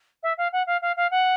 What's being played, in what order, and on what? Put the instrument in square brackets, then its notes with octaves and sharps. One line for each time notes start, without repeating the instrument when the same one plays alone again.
[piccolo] E5
F5
F#5
F5
F5
F5
F#5